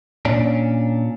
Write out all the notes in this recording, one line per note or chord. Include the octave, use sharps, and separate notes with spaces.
A#2 C#4 D4